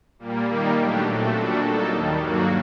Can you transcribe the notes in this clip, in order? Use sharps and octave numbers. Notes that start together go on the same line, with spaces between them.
A#2 G3 A#3
D#3 G3 A#3 D#4
F#3 A3 D4 G4
A#2 A3 C4 F#4 A4
A#2 G3 D4 F#4 A4
F#3 A#3 D#4 A4
D#2 D#3 G3
G2 F#3 A#3 F#4